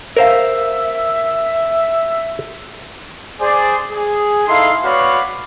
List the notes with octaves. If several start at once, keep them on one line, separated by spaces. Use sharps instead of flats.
A#4 C5 E5 F5
G#4 C5 D5
G#4
D#4 E4 A4 F5 B5 C6
B3 F#4 C#5 D5 F5 B5